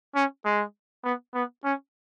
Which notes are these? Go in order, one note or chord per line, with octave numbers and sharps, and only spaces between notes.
C#4
G#3
B3
B3
C#4